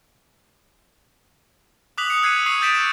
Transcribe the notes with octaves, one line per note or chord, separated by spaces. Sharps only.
D6 D#6 F#6 B6 F7 F#7
C#7
E6 F#6 G#6 C7 C#7 D#7
C#6 D#6 E6 C7 D#7
E6 G6 A6 B6 D7 E7
E7